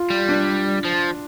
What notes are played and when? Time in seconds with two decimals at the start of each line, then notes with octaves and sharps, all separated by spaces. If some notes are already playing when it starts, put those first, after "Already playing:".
Already playing: F4
0.10 G3
0.29 D4
0.85 F3